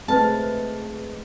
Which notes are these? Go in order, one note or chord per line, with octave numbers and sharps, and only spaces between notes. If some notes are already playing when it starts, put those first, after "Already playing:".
G#3 A3 C4 B4 A5 F6